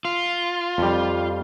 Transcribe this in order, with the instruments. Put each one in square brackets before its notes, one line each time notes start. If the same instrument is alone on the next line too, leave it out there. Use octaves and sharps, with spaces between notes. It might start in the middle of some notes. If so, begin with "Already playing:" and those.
[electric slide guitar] F4
[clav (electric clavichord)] F2 G3